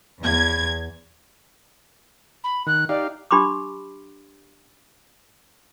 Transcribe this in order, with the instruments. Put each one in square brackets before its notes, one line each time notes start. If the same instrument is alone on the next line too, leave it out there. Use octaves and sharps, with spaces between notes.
[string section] E2 G#6
[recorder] B5
[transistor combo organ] D#3 [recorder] F#6
[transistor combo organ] D#4 G4 F5 [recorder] D5
[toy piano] D4 G4 B5 C6 D6